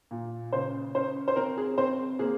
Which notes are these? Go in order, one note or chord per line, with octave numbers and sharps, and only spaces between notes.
A#2
C#3 C5
C#4 C5
C5
C4 A#4
G#4
C4 C5
A#3 G#4